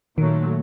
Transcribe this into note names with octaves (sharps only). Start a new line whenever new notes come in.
A#2 D#3 F#3 A3